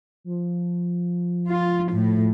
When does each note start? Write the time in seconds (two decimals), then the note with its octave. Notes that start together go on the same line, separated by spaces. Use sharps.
0.24 F3
1.50 F4
1.91 A2